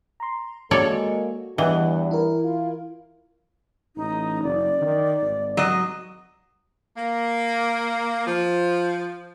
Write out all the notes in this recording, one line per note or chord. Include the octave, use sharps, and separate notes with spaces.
A#5 C6
G#3 A#3 F#4 A4 C#5 D5
E2 G2 E3 D#5 F#5 G5
E4 A#4
F4
A1 D#4
F#1 D5
D#3
G#1
F#3 D#5
A#3
F3